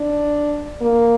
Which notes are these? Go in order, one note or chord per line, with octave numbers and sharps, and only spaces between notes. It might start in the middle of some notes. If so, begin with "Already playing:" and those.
Already playing: D4
A#3